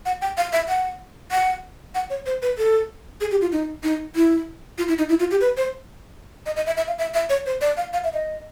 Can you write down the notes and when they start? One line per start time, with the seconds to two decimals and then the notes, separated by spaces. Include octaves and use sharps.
0.06 F#5
0.22 G5
0.37 F5
0.53 E5
0.68 F#5
1.32 F#5
1.95 F#5
2.10 C#5
2.26 C5
2.42 B4
2.58 A4
3.21 G#4
3.31 G4
3.41 F4
3.52 D#4
3.84 D#4
4.16 E4
4.78 F4
4.88 E4
4.99 D#4
5.09 E4
5.20 F4
5.31 G4
5.41 B4
5.57 C5
6.46 D#5
6.56 D#5
6.66 E5
6.77 E5
6.88 F5
6.99 E5
7.14 E5
7.30 C#5
7.46 C5
7.61 D5
7.77 F5
7.93 F5
8.04 E5
8.13 D#5